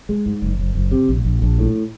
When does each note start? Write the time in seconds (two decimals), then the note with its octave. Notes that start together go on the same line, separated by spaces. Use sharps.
0.09 G#3
0.26 G#2
0.42 F#1
0.59 F#1
0.75 F#1
0.91 C3
1.08 A#1
1.25 A#1
1.42 A#1
1.58 A2